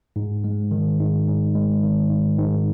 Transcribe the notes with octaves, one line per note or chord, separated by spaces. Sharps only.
G#2
G#3
D#3
G#2
G#2
G#3
D#3
G#2
G#2